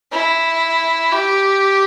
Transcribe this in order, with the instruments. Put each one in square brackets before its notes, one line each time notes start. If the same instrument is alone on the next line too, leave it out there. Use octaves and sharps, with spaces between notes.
[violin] E4
G4